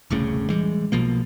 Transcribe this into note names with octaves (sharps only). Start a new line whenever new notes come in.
E1 C2 A2 C#3
E3 G3 G#3
B1 B2 F3 A#3